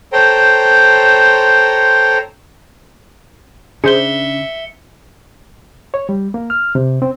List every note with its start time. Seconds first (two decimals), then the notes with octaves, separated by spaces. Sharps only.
0.13 A4 C5 C#5 G5 A#5 C6
3.84 C#3 D4 G#4 C5 E5 C#7 G7
5.94 C#5
6.09 G3
6.34 A#3
6.50 F6
6.75 C3
7.02 C4